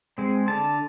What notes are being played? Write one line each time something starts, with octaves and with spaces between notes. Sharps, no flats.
G#3 C4
D3 A5